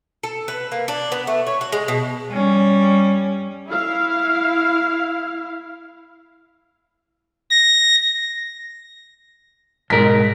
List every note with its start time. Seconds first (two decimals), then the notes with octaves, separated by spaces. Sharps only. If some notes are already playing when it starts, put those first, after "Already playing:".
0.23 A4
0.48 B4
0.72 A#3
0.88 D4
1.12 B3
1.27 A3
1.47 C#5
1.61 F#4
1.72 G#3
1.88 B2
2.32 G3 C#4
3.68 E4 F5
7.50 A#6
9.90 B1 G#2 G#3 A#4 B6